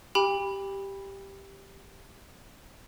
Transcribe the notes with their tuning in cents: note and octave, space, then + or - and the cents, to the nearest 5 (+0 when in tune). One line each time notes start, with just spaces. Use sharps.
G4 +0 G5 +35 B5 -5